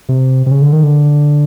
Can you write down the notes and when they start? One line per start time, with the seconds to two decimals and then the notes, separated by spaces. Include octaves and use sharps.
0.09 C3
0.46 C3
0.51 C#3
0.62 D3
0.73 D#3
0.83 D3